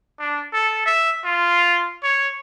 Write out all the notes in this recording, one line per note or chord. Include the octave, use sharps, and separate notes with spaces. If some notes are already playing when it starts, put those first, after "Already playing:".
D4
A4
E5
F4
C#5